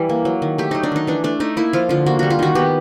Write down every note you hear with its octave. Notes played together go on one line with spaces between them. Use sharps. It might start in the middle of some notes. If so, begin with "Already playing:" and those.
Already playing: E3 G3
A#3
F#3
D#3
A3 G4
F#3 D#4
D4
D#3 D#4
E3 D4
A3 D4
A3 D#4
A#3 E4
F3 F4
D3 F4
A#3 F#4
G3 F#4
F4
D#3 F#4
B3 G4